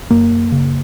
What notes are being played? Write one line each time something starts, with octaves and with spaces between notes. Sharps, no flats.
F#2 A#3
C#3